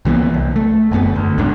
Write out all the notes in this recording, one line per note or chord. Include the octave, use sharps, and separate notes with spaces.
C2 E3 A#3 B3
C2
A3
G1 F#2 B3
D2
C#2 G#2 B2 D4